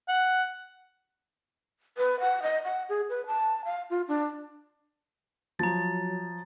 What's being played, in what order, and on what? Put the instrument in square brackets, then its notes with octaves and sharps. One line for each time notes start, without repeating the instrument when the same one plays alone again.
[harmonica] F#5
[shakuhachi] B4
F#5
D#5
F#5
G#4
B4
A5
F5
F4
D4
[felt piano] F3 [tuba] F#3 [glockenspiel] A#5 A6